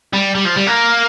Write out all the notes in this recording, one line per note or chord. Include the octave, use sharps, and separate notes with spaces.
G3
G3
F3
G3
A#3